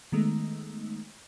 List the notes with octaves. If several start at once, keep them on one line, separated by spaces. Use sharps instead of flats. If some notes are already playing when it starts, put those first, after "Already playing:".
D#3 G#3 A3 B3 D#4